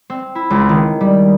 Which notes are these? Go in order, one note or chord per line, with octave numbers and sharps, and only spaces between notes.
C4
E4
C#2
D#3
G3